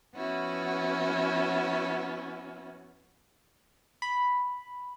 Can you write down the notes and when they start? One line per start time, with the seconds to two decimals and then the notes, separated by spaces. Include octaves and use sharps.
0.15 F3 B3 C#4 E4 F#4
4.02 B5